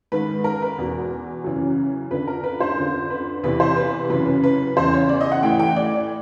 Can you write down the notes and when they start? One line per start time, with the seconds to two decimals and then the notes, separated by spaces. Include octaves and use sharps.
0.12 G#2 D#3 B4
0.44 A#4
0.62 B4
0.78 E2 B2
1.44 F#2 C#3 E3
2.11 F2 D3 B4
2.27 A#4
2.44 B4
2.60 C5
2.77 F2 D3
3.10 B4
3.43 E2 C3 E3 B4
3.60 C5
3.76 B4
4.10 F#2 C#3 E3 B4
4.26 B4
4.44 B4
4.77 E2 C#3 E3 C5
4.93 C#5
5.09 D5
5.21 D#5
5.32 F#5
5.43 A2 E3 G5
5.59 G5
5.76 D5